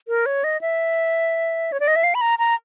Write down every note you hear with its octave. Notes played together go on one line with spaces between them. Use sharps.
A#4
C#5
D#5
E5
C#5
D5
D#5
E5
F5
B5
A#5
A#5